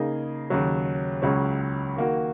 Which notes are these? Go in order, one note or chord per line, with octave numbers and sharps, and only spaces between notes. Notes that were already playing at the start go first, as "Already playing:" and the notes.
Already playing: C#3 A#3 D#4 G#4
D#2 C#3 F#3
C#2 C#3 F#3 C#4
D#3 A#3 F#4